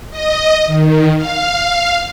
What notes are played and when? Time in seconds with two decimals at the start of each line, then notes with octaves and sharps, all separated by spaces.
0.11 D#5
0.66 D#3
1.16 F5